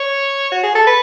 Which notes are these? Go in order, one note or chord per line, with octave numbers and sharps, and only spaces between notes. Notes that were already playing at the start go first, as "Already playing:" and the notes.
Already playing: C#5
F#4
G#4
A4
B4